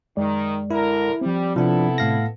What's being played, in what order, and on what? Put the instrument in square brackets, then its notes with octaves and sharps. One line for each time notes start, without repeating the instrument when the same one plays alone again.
[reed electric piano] F#2 G#3 D5 [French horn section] D#3
[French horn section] D3 A#4 [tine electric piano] E4
[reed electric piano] F3 C4 [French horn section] G3
[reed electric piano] C3 C4 [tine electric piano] F3 D4 [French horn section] B3 E4 A4
[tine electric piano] A2 F5 A#6